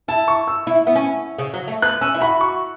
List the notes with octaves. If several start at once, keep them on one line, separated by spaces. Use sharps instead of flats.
E4 A5
C#6
E6
E4
B3
C#4
C#3
F#3
A3
B3 F#6
C#4 E6
E4
F#4 B5
C#6